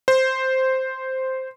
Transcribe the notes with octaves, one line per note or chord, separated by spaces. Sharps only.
C5